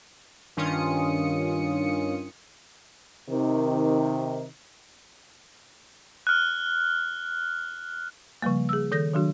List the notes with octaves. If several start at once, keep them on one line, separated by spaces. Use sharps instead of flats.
G2 D#3 C#4 F4 D#6 C#7
C3 D#3
F6 F#6
C#3 F3 G3 A#3
G#4 E6
D#3 A4 G6 A#6
D#3 F#3 D4 F#4